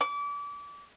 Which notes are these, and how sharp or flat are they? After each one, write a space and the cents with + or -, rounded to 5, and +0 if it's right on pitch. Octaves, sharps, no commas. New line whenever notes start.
D6 -30